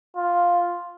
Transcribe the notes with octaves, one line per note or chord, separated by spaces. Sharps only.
F4